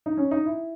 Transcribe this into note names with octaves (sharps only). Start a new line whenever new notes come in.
D#4
C#4
D#4
E4